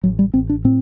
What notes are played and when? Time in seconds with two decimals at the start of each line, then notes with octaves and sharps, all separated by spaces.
0.03 A1 F#3
0.19 G3
0.34 A1 C4
0.49 D4
0.64 A2 C4